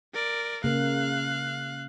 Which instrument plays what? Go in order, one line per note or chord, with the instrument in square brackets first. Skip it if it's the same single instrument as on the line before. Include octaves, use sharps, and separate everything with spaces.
[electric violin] A#4 D5
[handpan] C#3 A#3 [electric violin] F5 F#6